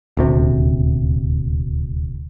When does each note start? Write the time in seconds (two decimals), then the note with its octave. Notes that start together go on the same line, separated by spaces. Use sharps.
0.17 D#1 D2 C3